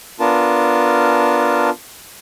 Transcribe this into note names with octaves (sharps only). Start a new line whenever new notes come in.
B3 D4 F4 A#4 A5